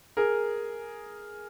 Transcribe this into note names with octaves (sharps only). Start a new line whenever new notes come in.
G#4 A#4